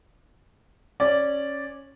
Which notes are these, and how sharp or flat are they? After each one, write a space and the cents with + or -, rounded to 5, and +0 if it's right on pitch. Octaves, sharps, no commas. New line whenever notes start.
C#4 -10 D5 -5